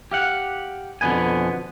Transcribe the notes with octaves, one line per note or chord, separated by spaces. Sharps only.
G4 F5 F#5
F2 B2 D3 B3 G#5